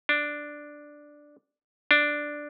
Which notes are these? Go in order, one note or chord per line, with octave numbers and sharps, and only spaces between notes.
D4
D4